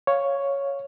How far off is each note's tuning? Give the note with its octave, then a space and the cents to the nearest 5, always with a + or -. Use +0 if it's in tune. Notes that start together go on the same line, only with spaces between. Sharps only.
C#5 +0 F5 +0